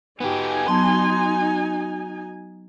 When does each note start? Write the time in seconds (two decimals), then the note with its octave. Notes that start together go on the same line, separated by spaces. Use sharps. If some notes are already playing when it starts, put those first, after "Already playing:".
0.20 B3 D#4 F#4 G4 G#5
0.68 F#3 B3 A5 C6